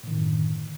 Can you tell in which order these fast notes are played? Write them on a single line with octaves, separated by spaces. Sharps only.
A2 D#3 D3 F#2